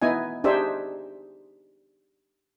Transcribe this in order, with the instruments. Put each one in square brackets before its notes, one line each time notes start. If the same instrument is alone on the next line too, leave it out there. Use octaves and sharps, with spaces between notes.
[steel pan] B3 D#4 E4 D#5 G#5
D4 D#4 G4 G#4 C5 E5